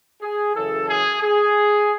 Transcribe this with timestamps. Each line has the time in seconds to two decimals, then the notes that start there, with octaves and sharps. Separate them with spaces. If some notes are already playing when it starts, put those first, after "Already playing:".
0.22 G#4
0.55 F#2 C#3 E3 A4
0.88 G#4
1.22 G#4